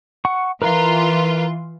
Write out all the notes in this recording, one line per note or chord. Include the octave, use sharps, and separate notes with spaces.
F#5 C#6
E3 F4 A#4 B4 A#5